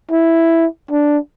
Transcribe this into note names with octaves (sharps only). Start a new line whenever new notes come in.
E4
D4